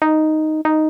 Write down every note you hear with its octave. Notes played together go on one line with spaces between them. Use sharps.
D#4
D#4